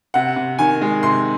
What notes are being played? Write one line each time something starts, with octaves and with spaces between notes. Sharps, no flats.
C3 F#5
C3
D#3 G#5
G#3
C3 C6